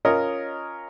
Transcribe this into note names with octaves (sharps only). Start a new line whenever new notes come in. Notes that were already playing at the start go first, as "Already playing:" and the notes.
C#4 F4 A#4 C#5 D#5